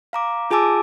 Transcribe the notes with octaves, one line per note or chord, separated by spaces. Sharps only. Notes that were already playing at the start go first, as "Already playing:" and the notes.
F5 A#5 D6
F4 G#4 G#5 A5 D6 E6